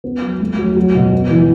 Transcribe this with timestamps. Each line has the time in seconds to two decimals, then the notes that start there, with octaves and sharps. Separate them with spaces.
0.04 B3
0.22 F#3
0.40 A3
0.59 F#3
0.77 F#3
0.95 B2
1.13 B3
1.31 E3